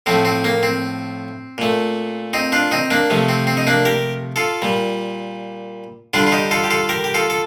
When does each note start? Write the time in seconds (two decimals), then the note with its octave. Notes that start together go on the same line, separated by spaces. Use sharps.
0.06 A2 F3 A3 C4
0.25 C4
0.44 A#3
0.63 C4
1.58 A#2 A3
2.33 C4 D#4
2.52 D4 F4
2.71 C4 D#4
2.91 A#3 D4
3.10 C3 F3 A3
3.29 C4
3.47 C4
3.57 D#4
3.67 A#3 D4
3.85 G4 A#4
4.36 F4 A4
4.62 A#2 G3
6.13 D3 G3 D4 F4
6.27 F4
6.32 D#4 G4
6.51 F4 A4
6.64 G4
6.70 F4 A4
6.89 G4 A#4
7.04 G4
7.14 F4 A4
7.30 A4